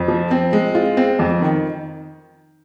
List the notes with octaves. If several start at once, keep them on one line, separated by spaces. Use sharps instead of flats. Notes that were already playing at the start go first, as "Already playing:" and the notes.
Already playing: F2
F3
C4
G#3
F4
C4
F2
D#3